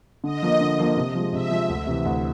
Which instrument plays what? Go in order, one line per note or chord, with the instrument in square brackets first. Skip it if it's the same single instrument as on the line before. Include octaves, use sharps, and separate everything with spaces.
[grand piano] D3 [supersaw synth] D#5
[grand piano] F3 A#3
D3
F3 A#3
C3
F3 G#3
[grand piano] C3 [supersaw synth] E5
[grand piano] F3 G#3
D2
C3 E3
D2